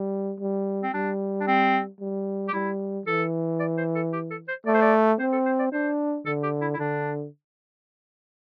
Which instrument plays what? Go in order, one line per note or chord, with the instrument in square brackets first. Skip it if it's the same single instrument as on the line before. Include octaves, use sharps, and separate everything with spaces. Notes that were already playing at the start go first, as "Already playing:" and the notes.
Already playing: [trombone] G3
G3
[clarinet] C4
[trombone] G3 [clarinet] D4
[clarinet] D4
C4
[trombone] G3
[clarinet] G4
[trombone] G3 [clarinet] E4
[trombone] E3 [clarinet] A4
[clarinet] D5
C5
A4
G4
A4
C5
[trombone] A3 [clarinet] D5
[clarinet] C5
D5
[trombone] C4 [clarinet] C5
[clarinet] A4
C5
D5
[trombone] D4 [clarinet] C5
[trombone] D3 [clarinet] A4
[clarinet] G4
E4
E4
[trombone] D3 [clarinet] D4